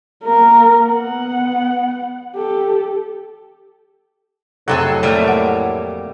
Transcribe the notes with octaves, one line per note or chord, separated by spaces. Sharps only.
A#3 A#4
B3 F#5
G4 A4
F2 A2 C3 F#3 G#4 A4 F#5
G3 A3 A#3
F#5